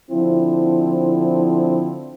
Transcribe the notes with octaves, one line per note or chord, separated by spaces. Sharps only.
D3 F3 C4 E4